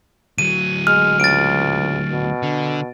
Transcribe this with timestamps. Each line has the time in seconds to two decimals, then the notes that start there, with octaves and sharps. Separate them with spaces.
0.38 D2 F#3 D#7
0.87 G#3 F6
1.20 C#2 A6 D7
2.13 B2
2.43 D3